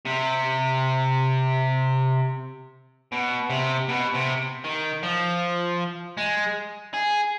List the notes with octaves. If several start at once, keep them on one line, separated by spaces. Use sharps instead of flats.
C3
B2
C3
B2
C3
D#3
F3
G#3
G#4